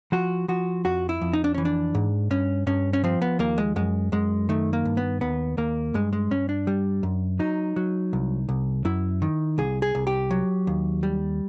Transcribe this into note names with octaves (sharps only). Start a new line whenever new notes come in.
F3 F#4
F3 F#4
F2 F#4
E4
F2
D#4
D4
E3 C#4
D4
G#2
G2 C#4
G2 C#4
C#4
F3 C4
B3
D#2 A#3
G#3
F#2 G#3
F#2 G#3
D#3 A3
A#3
G2
B3
D#2 B3
D#2 A#3
G2 G#3
G#3
G2 C#4
D4
G3
F#2
F#3 D#4
F#3
C2
C2
F#2 E4
D#3
C2 G#4
G#4
C2
G4
F#3
D#2
G3